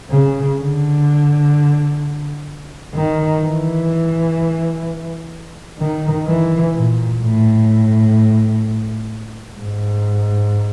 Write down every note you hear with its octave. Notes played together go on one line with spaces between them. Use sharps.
C#3
D3
D#3
E3
D#3
E3
A#2
A2
G#2